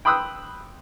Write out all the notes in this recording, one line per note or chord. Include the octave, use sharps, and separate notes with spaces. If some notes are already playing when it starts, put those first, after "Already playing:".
G5 B5 C6 D#6 E6 F#6